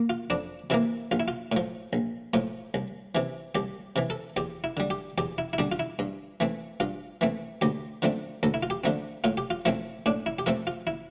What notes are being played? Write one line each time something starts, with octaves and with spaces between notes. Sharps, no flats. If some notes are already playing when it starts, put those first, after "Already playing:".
Already playing: A#3
F4
F2 D4
C3 E3 A#3 E4
A#1 F4
E4
F4
A2 F3
A#1
A2 F3
C2
C3 E3
C2 G4
C3 E3
A4
E2 G4
E4
D3 G3
G4
E2 G4
E4
E4
D3 G3 D4
F4
E4
G2
E3 A3 C4
G2 F4
E3 A3 C4
D2 G4
D3 F3 A3 C4
D2 A4
E4
F4
G4
D3 F3 A3 C4
A2 F4
G4
F4
F3 A3 C4 E4
A2 D4
E4
G4
F3 A3 C4 A4
F4
E4